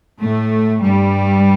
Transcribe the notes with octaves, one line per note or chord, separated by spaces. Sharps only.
A2 A3
G2 G3